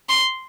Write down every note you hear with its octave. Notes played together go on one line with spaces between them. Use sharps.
C6